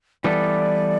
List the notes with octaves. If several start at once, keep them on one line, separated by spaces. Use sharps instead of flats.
E3 G3 B3 E4 A4 D5